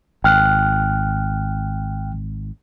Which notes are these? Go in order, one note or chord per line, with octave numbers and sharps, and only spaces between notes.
G#1 G5 F6 F#6